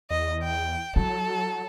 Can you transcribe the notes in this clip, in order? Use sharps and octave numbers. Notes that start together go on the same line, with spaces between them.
E2 D#5
G5
F#3 E4 A4